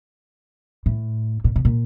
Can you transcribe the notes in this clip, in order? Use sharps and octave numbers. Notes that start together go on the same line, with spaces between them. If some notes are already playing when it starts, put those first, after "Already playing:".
A2
A#2
B2
A#2